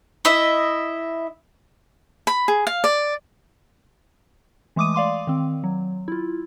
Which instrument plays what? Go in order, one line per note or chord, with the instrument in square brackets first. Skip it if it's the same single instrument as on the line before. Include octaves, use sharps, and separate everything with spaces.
[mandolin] E4 D#5 E5
[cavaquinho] B5
G#4
F5
D5
[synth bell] E3 G#3 A3 D6 D#6 D#7
D5 F5 C6 D6
D#3 C4
F#3
E4 F4